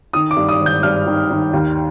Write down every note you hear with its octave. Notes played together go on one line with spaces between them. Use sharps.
D#3 D#6
D6
G2
D#6
G#1
G6
G2 F6
D#3
D#3
D#2